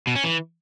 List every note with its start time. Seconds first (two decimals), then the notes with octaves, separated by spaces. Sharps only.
0.07 B2
0.16 C#4
0.24 E3